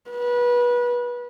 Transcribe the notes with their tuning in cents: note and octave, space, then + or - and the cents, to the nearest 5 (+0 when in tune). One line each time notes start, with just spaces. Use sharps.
B4 -25